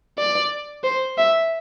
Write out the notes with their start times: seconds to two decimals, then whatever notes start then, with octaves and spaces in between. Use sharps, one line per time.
0.19 D5
0.84 C5
1.18 E5